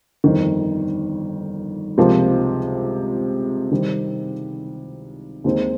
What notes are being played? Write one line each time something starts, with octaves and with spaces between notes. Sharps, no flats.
G1 F2 D#3
C#2 C3 F3 A#3
C3 D#3 G3 C4
D#2 D#3 G#3 C4 D#4